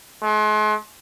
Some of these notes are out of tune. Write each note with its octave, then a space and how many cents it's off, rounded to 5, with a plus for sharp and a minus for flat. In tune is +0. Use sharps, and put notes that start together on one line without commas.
G#3 +45